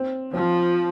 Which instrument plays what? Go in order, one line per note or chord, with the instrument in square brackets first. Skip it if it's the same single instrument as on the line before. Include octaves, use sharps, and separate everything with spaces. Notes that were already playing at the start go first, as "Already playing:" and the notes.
Already playing: [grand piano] C4
[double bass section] F3 [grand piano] C4